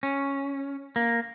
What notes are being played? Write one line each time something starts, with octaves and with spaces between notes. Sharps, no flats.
C#4
A#3